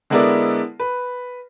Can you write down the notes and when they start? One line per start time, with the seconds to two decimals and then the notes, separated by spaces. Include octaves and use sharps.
0.10 D3 G#3 B3 E4 A#4 D5
0.80 B4